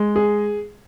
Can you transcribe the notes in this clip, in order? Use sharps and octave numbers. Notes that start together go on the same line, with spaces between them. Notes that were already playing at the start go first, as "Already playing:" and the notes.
Already playing: G#3
G#4